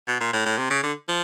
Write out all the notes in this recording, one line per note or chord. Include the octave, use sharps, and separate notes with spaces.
B2
A#2
A2
A2
C3
C#3
D3
F3